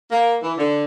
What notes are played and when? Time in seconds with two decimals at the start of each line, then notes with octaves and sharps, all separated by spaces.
0.11 A#3
0.41 E3
0.56 D3